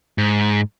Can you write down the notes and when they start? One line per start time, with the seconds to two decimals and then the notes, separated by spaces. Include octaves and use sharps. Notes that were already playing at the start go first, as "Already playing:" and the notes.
0.18 G#2